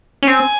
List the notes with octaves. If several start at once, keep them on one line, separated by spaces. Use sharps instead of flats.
C#4
C4 G#5